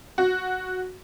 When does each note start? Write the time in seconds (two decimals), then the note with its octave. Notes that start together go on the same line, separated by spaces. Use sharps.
0.18 F#4